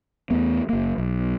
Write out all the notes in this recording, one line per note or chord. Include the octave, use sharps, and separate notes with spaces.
E2 A3 B3
F#1 A#3
B1